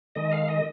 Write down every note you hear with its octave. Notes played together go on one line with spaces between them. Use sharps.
D#3 G#3 D#5
F5
D#5